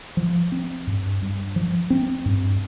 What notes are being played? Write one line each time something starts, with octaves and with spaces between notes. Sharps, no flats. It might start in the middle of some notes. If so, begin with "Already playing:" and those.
F3
C4
G2
G2
F3
C4
G2